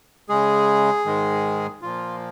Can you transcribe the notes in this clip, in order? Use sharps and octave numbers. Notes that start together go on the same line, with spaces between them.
C#3 G#3 G#4
G#2 D#3 G#3
A#2 F3 A#3 F4